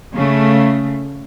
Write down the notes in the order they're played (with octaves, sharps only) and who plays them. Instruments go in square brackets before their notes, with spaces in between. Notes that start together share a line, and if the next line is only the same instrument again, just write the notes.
[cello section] C#3 A3